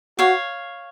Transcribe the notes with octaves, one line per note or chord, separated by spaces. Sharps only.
F#4 C#5 F5